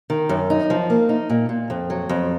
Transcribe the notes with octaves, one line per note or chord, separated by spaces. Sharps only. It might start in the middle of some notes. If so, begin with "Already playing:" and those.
D#3
F#2
D#4
F3
A#3
D#4
A#2
A#2
F2
F#3
F2